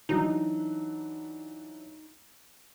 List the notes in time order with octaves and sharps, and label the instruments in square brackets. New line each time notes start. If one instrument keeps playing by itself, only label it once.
[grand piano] E3 F#3 D4 [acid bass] D#4